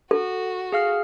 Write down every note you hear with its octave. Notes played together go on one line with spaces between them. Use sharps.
F#4 A4
G#4 F5 F6